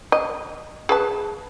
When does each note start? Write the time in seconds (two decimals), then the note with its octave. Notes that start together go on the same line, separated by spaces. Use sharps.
0.12 D#5
0.89 G#4 B4 A5